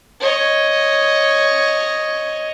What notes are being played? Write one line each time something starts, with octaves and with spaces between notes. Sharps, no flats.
C#5 D#5